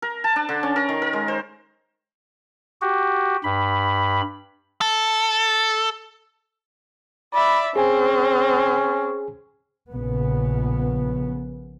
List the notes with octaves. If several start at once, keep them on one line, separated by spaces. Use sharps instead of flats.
A#4
A5
D4
D3
C#4
A#4
D#3
A#4
G#3
C5
F#4 G4
G2 B5
A4
D5 E5 B5
C4 C#4 G#4 G#5
A#1 C#3 B3